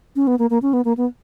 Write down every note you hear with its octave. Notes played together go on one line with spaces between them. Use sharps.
C#4
B3
A#3
A#3
C#4
B3
A#3
B3